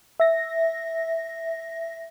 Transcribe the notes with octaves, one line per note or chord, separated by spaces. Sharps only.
E5 A#6